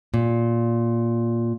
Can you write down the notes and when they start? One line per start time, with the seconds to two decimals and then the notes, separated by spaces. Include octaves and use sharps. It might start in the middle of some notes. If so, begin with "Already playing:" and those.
0.14 A#2